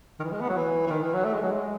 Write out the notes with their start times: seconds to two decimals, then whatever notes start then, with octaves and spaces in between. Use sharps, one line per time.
0.20 D#3
0.24 E3
0.32 G#3
0.41 B3
0.49 F#3
0.57 E3
0.87 E3
0.91 D#3
1.02 E3
1.13 F#3
1.25 A3
1.33 G#3
1.42 F#3
1.51 G#3